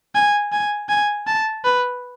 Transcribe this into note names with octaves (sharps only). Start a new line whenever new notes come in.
G#5
G#5
G#5
A5
B4